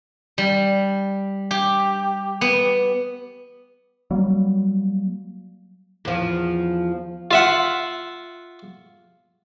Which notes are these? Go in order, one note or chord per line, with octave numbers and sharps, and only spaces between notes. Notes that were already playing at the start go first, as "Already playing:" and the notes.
G3
G4
B3
F#3 G3 A#3
E2 F3
F4 E5 F#5